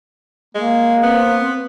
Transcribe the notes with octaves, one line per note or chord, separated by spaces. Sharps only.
G#3 A#3
B3 C4